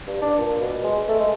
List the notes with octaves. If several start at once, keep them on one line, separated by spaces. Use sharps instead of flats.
G2
D4
A#2
B2
G#3
A3
G#3